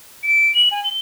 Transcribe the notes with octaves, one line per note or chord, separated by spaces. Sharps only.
D7
F#7
G#5
G7